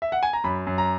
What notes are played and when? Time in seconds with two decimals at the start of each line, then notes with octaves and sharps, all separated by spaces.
0.02 E5
0.12 F#5
0.23 G#5
0.33 A#5
0.44 F#2 B5
0.67 F#2
0.78 A#5